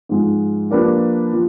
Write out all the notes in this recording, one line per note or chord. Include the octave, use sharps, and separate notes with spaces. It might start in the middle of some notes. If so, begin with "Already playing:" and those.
G#2 F3 G#3
F3 A#3 D4 G4 B4
F3